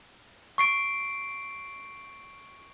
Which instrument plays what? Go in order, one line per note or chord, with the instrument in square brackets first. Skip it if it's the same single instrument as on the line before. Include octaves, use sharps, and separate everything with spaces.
[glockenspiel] C#6 C7 D7